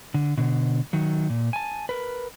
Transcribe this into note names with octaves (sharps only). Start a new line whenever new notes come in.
D3
B2 D3
D#3 F#3
A#2
G#5 A5
A#4 B4